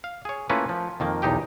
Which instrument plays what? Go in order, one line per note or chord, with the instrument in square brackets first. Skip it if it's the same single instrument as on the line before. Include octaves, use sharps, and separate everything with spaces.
[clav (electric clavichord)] F5
G#4 C#5
A3 A#3 C#4 E4 F4 B4
F3
F2 D#3 A#3
B1 E2 D#4 G4 G5